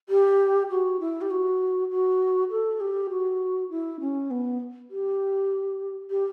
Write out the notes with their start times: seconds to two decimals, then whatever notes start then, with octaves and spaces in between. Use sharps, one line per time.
0.09 G4
0.70 F#4
1.00 E4
1.21 G4
1.30 F#4
1.90 F#4
2.50 A4
2.80 G4
3.10 F#4
3.70 E4
4.01 C#4
4.31 B3
4.90 G4
6.10 G4